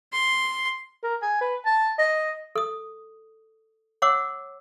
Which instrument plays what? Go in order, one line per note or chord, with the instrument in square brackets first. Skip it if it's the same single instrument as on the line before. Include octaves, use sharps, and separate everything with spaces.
[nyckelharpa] C6
[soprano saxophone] A#4
G#5
B4
A5
D#5
[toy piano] A4 D#6
C#5 F#5 D6 E6